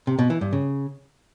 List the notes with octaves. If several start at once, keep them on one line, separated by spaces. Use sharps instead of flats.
C3
B2
E3
G2
C#3